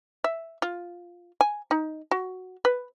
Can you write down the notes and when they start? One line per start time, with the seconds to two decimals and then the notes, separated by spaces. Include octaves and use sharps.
0.24 E5
0.62 F4
1.41 G#5
1.71 D#4
2.11 F#4
2.65 B4